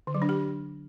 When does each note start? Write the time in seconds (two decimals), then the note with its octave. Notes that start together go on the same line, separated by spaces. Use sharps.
0.07 D3
0.15 F#3
0.22 D4
0.29 G4